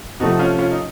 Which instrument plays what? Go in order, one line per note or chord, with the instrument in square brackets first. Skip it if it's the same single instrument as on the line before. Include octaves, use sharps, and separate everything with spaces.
[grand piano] C3 F3 A3 [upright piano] D#4 F#4
[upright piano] C#4 F4
C#4 F4
D#4